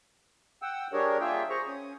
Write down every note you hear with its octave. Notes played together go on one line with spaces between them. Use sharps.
F#5 G5 E6
G3 D4 G4 G#4 A#4 C#5
A#3 F4 G#4 E5 G5
G#4 C5 A#5 C#6
C#4 D#6